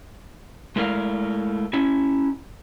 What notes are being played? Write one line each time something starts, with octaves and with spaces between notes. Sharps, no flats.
G#3 A3 E4 A#4 F5
C#4 E4